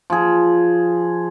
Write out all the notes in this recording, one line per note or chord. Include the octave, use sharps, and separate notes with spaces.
F3 G#4